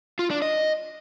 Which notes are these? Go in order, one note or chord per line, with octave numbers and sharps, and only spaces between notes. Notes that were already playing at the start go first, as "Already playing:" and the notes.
F4
D4
D#5